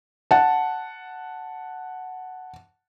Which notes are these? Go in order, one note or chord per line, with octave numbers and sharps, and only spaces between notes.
F#5 A5